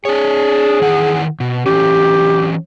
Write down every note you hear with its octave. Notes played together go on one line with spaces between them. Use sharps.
D4 G#4 C#5
D#3 E3 F#5
B2
E3 F#3 C#4 G4